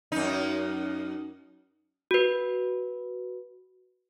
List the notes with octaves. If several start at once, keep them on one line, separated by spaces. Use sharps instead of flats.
F#2 D#4
F#4 B4